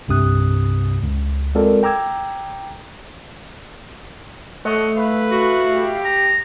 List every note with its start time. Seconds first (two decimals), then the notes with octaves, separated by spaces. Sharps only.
0.08 C2 G2 C3 D#6 F#6
1.02 C#2
1.55 G#3 C4 F4 A4 A#4 D5
1.83 G5 A#5 D6 E6 G#6
4.65 A3 C#5 D#5 F#5
4.96 E4 B4 F5
5.31 F#4
5.74 G4
6.05 A#5